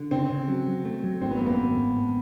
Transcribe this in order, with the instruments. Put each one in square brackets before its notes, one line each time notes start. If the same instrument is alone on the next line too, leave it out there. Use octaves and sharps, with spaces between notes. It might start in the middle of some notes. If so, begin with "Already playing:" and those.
Already playing: [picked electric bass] D3
[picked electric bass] C#3 [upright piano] C4
[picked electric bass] C#3
F#3
F#3
A3
F#3
[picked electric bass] G#1 [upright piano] C4
[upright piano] B3
[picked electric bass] F#2 [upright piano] A#3
[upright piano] B3
[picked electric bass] G#1
G#1
G#1